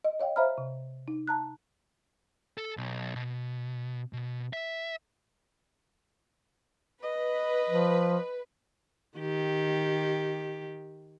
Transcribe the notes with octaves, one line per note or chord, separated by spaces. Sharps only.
D#5
C#5 D#5 F5 G5
C5 E5 F5 A#5 B5 F6
C3
D#4
A5 A#5 F#6
A4
B1
B2
B2
E5
B4 D#5
F3
D#3 G4